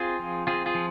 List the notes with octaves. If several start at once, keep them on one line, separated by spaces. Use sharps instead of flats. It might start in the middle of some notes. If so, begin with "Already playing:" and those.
Already playing: C4 F4 G#4
F3
C4 F4 G#4
F4 G#4
F3